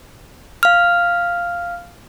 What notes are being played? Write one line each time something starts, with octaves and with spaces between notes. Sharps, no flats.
F5 F6